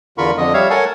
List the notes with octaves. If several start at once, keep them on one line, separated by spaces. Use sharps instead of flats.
E2 D3 F4 A#4 B5 C#6
F2 D3 D#5
G3 C#5 E5 F5
A4 A#4 C#5 F#5 G#5 A5